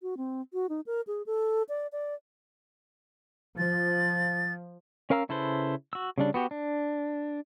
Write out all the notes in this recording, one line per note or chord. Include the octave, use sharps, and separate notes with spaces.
F#4
C4
F#4
D#4
A#4
G#4
A4
D5
D5
F3 A6
C#4 A#4 F5 A#5 E6
C#3 E4 A4 B4 C5
F#4 E6
C#3 G3 D4
B3 F#4 G4
D4